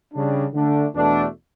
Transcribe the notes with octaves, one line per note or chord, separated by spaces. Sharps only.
C#3 G3 D4
D3 A3 D4
E2 B2 A3 D4